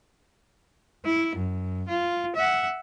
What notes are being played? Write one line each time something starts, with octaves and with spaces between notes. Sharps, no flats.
E4
F#2
F4
E5 F#5